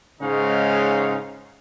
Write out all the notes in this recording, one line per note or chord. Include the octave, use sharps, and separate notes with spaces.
G#2 C#3 G#3 C#4 D#4 F5